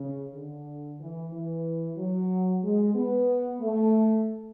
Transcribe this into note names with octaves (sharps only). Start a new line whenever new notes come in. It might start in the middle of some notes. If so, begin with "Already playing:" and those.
Already playing: C#3
D3
E3
E3
F#3
G#3
B3
A3